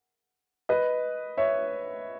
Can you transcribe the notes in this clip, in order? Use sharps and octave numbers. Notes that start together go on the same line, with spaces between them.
B4 D#5
C#5 E5